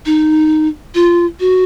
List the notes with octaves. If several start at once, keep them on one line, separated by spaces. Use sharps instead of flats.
D#4
F4
F#4